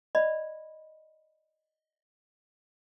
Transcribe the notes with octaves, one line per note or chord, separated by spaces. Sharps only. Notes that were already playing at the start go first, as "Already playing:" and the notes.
D5 D#5 B5